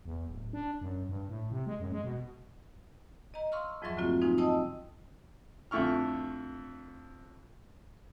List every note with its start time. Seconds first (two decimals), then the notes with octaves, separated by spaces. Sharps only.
0.05 E2
0.29 D1
0.53 D4
0.81 F#2
1.09 G2
1.29 A2
1.51 C3
1.67 G#3
1.80 F#2
1.92 G#3
2.04 B2
3.34 D#5 A#5
3.52 F5 C6 C#6 E6 F6
3.82 F2 G#2 F3 F#3 E5 C#6
3.97 D3 A3 A#3 C4 F4 F#4
4.21 F3 C4 D#4 F4 G#5
4.38 D#5 G5 A5 D#6 E6
5.71 F2 D3 A3 E4 C#6 F6